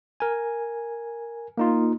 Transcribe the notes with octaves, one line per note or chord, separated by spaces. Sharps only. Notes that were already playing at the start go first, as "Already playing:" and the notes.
A#4 G#5
A#3 D#4 F4